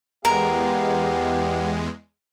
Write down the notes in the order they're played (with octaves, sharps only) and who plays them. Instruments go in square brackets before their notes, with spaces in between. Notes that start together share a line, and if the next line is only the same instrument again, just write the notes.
[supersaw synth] E2 G#3 [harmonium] B3 F5 [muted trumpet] G4 [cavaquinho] A#4